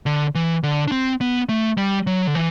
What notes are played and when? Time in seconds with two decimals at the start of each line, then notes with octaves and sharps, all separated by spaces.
0.06 D3
0.35 E3
0.63 D3
0.88 D4
0.92 C4
1.21 B3
1.49 A3
1.78 G3
2.07 F#3
2.27 D3
2.35 E3